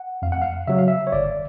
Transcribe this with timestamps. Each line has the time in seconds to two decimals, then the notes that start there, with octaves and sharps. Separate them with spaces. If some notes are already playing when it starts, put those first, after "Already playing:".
Already playing: F#5
0.22 F2 F5
0.32 F#5
0.42 F5
0.67 C#3 F#3 E5
0.78 F5
0.88 E5
1.07 C#5
1.12 G1 D5